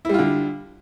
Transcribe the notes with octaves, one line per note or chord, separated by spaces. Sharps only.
D3 G3 E4 F4